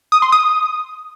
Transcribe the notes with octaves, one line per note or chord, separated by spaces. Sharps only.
D#6
C6
D#6